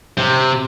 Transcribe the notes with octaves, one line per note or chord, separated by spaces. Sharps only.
C3